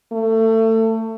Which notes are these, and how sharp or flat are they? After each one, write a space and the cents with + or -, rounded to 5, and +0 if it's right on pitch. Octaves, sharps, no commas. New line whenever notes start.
A3 +25